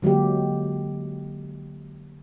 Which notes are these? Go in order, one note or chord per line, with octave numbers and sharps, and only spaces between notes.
D3 F#3 G#3 A#3 G4